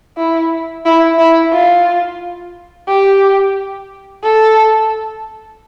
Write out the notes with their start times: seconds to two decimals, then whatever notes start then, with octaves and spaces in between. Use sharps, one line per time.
0.18 E4
0.86 E4
1.19 E4
1.53 F4
2.88 G4
4.23 A4